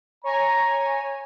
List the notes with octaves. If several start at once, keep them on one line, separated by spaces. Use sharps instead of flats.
C#5 G#5 A#5